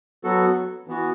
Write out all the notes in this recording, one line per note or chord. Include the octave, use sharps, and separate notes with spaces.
F#3 B3 F#4 A4
E3 B3 F#4